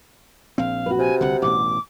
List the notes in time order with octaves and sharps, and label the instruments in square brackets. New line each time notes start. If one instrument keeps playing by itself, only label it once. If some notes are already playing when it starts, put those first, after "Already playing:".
[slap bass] A#1 C4 [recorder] F5
[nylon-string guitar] F#4 B4
[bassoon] C3 [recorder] G#5
[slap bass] C2 D3 [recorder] F#5
[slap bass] A1 G2 B2 [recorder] D6